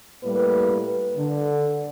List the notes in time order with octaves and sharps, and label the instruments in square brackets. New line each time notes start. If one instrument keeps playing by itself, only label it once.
[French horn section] A2 G3 A#3 B4
D3